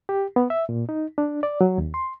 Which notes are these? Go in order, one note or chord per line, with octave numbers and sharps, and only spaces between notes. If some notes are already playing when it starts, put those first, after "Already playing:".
G4
B3
E5
A#2
D#4
D4
D5
F#3
D#2
C6